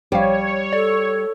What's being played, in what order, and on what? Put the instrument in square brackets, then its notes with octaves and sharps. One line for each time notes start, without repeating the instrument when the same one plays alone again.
[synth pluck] A#1 F3 F5 [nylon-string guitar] G3 [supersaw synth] C#5
[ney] A4 [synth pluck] D5